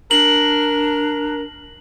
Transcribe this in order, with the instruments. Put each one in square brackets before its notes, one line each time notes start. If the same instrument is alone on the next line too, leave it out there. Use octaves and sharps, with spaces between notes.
[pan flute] D4 [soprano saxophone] A#4 [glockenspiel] F#7